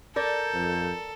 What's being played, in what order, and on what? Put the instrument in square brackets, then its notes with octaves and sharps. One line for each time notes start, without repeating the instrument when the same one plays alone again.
[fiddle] A4 [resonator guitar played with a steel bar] A#4 D5 [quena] G6
[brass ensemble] F2